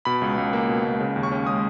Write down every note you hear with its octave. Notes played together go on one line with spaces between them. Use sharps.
B2 B5
C#2
C#2
A#3
B2
C#2
C#3
D#2
C#6
C#4
G#3 D#6